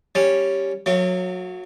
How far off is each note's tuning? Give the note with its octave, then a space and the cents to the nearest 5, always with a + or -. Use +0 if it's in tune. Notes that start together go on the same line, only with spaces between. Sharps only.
G3 +0 C#4 +0
F#3 -20 A3 +45